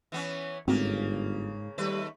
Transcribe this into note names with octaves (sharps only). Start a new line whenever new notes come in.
E3 B3 C#4
G1 G#2 C#3 A3 A#3 C4 F#4
D#2 G3 A3 B4